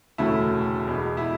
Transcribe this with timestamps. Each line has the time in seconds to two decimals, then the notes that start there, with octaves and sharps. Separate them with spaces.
0.18 E1 D2 C#3 F#3 A3 E4
0.87 E2 B2 G#3
1.17 E4